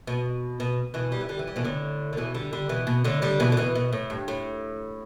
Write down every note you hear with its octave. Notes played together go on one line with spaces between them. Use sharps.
B2
B2
B2 E3
G3
E3
D3 G3
E3
G3
B2 E3
A2 D3
D3
B2 E3
D3 G3
D3 G3
B2 E3
B2
A2 D3
D3 G3
B2 E3
D3
B2 E3
B2
A2
G2
A2